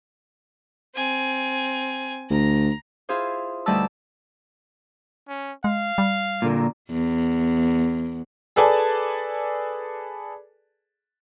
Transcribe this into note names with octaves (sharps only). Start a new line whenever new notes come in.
C4 G#5
D2 A#5
E4 F4 G#4 C5
D2 G3 D#4 B4 A5 E6
C#4
G#3 F5
G3
A#2 D3 A#3
E2
G#4 A4 B4 D5 G#5 A5